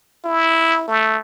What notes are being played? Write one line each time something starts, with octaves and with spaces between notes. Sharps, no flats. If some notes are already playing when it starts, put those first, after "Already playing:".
E4
A3